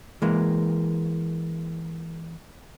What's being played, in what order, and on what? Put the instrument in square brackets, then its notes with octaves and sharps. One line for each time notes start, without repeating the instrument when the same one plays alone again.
[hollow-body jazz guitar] E3 G#3 A#3